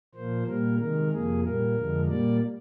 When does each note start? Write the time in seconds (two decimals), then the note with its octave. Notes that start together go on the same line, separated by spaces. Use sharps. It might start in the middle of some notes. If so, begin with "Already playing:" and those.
0.14 A#2 F3 A#3 C5
0.47 A#2 G3 A#3 A#4
0.79 C3 D#3 G#3 A#4
1.11 F2 C3 F3 A#3 G#4
1.43 A#2 G3 A#3 A#4
1.76 F2 D3 F3 G#3
2.08 A#2 G3 A#3 D5